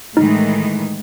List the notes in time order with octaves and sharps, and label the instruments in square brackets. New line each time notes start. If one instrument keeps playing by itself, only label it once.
[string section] A2 D#3 E3 [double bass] G#3 [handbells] D#4